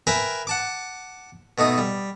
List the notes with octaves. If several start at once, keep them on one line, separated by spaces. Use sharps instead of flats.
A#4 B4 E5 G5 G#5 A#5
F#5 A5 D6
B2 A3 D#4 D#6
G3